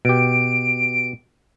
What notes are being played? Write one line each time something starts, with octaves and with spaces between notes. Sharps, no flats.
B2 G4 D7